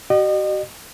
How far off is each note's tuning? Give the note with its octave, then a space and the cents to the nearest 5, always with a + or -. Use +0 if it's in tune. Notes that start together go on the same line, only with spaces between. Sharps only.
F#4 +45 D#5 -40